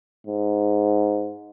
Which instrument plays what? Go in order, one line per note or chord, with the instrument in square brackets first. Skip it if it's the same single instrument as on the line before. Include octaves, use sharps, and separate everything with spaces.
[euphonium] G#2